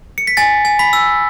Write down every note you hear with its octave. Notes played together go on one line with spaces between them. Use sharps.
C#7
B6
G#5 A6
G#5
B5 B6
E6